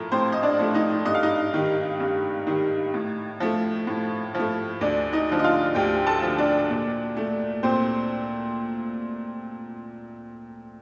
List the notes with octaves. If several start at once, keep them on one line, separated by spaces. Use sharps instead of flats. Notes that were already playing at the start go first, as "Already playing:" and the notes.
Already playing: A2 F3 A3 A#4
A2 C4 C5
D#5
D4 D5
F3 A3
D#4 D#5
G2 D#5
F5
D#4 D#5
D#3 G3
G2
D#3 G3
A2
F3 A3
A2
F3
A3
D2 D4 D5
D#4 D#5
D3 F3
D#5
F4 F5
D2 G4 G5
A4 A5
D3 F3
D4 D5
A#2
A3
A#2 C4 C5